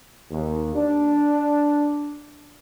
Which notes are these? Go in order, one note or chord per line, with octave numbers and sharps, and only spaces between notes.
D#2
D4